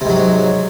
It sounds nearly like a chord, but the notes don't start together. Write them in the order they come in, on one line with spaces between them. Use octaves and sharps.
C3 G#2 F#3